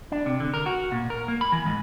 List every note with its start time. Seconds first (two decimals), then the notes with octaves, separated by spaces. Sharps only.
0.12 D4
0.26 C3
0.40 D3
0.54 A#4
0.66 F#4
0.92 A#2
1.10 A#4
1.28 A#3
1.41 B5
1.52 E3
1.66 G#2